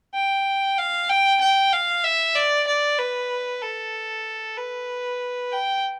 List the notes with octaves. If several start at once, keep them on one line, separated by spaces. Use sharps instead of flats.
G5
F5
G5
G5
F5
E5
D5
D5
B4
A4
B4
G5